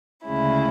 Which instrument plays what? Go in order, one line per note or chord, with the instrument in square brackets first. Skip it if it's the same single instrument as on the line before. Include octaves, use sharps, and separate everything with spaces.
[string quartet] D2 C#3 G#3 C#4 E4